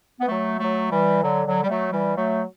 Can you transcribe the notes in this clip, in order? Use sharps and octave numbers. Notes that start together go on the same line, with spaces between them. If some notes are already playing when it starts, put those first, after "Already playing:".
B3
F#3 A3
F#3 A3
E3 G3
D3 F#3
D3 F#3
G3
F#3 A3
E3 G3
F#3 A3